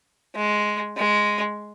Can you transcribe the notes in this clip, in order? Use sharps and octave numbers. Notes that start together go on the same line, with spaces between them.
G#3
G#3